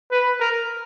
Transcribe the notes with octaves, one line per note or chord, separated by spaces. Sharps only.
B4
A#4